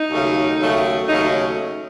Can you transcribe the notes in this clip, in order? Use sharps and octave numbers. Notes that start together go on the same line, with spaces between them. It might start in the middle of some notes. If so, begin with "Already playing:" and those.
Already playing: D#4
D#2 C#3 F#3 A3
D#2 C#3 F#3 A3
D#2 C#3 F#3 A3 D#4